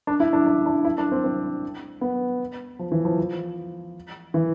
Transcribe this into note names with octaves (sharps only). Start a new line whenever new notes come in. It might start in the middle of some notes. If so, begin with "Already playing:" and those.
D4
E4
D4
D4
D4
E4
D4
C4
C4
B3
F3
E3
F3
F3
E3